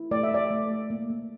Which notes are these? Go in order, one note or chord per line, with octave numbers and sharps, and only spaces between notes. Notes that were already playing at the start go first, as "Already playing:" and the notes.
Already playing: E4
A3 D5
E5
A3 D5
A3
A3
A#3
A#3